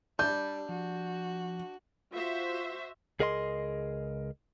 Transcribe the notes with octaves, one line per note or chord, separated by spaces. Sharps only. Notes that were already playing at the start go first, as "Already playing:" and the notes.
G3 D4 G6
F3 F#4
F4 F#4 C5 E5
C#2 G#4 A#4 D#5 F5 C6